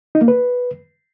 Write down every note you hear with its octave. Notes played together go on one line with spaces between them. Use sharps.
D#4
A#3
B4